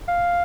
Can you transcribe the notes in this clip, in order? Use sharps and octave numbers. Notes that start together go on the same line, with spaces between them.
F5